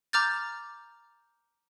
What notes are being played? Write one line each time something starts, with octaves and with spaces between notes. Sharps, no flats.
A#5 D6 F6 G6 A6